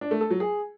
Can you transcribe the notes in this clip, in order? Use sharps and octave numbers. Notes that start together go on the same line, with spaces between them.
D4
A3
A4
F#3
G#4